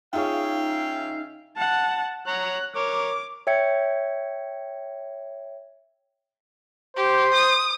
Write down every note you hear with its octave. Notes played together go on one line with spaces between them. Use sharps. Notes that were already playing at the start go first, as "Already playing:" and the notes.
C#3 D#4 F4 G#4 C#5 E5 F5 G5
F#5 A5
C#5 F#5 A#5 F#6
A#4 C#5 D6
C#5 E5 G5 G#6 C#7
G4 C5
D#6